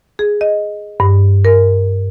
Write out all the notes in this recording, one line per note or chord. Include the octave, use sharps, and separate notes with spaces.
G#4
D#5
G2
A#4